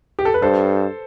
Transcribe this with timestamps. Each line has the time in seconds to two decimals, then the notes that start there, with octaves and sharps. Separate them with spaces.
0.19 G4
0.25 A4
0.34 B4
0.42 G2 A4 C5